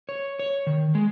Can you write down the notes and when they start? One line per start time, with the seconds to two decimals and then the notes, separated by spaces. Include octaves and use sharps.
0.09 C#5
0.39 C#5
0.67 D#3
0.95 G#3